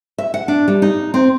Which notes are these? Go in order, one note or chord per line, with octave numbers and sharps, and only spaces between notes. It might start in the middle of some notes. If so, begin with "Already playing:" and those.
E5
F#5
D4
G3
D#4
C4